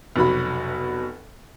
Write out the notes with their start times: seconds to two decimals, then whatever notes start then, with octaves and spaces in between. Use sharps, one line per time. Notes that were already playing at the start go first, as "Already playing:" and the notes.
0.16 F1 B2 F#3 F#4 B5